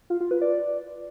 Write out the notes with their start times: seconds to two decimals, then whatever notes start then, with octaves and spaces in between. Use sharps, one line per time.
0.10 F4
0.21 F4
0.31 B4
0.41 D5